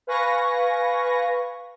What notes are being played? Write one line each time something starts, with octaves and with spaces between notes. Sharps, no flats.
B4 F5 G#5 C#6 A#6